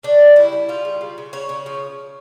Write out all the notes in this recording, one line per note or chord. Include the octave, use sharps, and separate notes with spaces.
C#3 D4
C#3
G3 E4
G3
G3 F4
C#3
C#3
C#3
C#3 C#5
C#3
F3